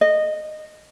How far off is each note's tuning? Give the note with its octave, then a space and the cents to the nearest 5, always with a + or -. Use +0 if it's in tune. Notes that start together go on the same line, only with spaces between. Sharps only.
D#5 -15